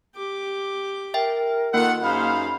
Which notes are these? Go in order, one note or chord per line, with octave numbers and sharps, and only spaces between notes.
G4 D6
A#4 E5 G5
D#3 A#3 F4 A4 F#5
F#2 D#4 G#4 C5 F5 B5